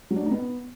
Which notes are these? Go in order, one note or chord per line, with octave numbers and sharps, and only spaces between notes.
F#3
D4
A3
D#4
B3